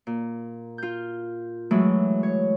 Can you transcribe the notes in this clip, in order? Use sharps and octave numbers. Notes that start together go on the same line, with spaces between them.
A#2
F4 G6
E3 F#3 G#3 A3
C#5